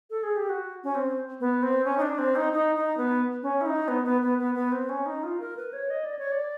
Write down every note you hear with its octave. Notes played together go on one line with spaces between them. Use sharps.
A4
G#4
G4
F#4
C#4
C4
B3
C4
C#4
D#4
D4
C4
D#4
D#4
D#4
B3
C#4
E4
D#4
B3
B3
B3
B3
B3
C4
C#4
D#4
F4
A#4
B4
C#5
D#5
D5
C#5
D5